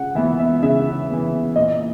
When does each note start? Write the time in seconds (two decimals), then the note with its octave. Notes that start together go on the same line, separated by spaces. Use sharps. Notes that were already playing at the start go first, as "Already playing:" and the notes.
Already playing: C#3 F#5
0.15 E3 B3 E5
0.39 E5
0.63 C#3 E5
1.10 E3 B3
1.56 A#2 D#5